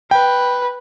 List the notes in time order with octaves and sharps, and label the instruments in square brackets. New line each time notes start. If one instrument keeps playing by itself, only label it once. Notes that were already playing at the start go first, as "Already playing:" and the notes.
[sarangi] B4 [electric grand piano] G5